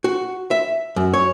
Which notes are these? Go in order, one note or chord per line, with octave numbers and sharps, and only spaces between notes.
F#4
E5
F#2
C#5